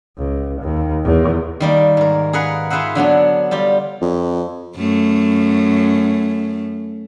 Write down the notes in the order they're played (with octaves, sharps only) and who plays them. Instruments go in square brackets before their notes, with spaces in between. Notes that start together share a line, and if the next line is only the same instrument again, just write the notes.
[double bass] C#2
D#2
E2
[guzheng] D#3 G3 A#3
G#2 A#4
G#4 A#4 B4 F5 F#5
F4 G#4 B4 C5 E5 F#5
D3 F#3 B3 D4
G3 F4 G4
[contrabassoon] F2
[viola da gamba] F#2 A3